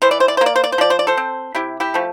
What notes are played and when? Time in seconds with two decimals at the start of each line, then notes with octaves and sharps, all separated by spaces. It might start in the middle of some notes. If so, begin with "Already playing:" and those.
0.02 E3 C5
0.11 D5
0.20 C5
0.28 D5
0.37 C5
0.41 A#3
0.46 D5
0.56 C5
0.64 D5
0.72 C5
0.78 F3 D5
0.90 C5
0.99 D5
1.07 A4 C5
1.17 C4
1.55 C3 E4 G4
1.80 E4 G4
1.94 F3 A3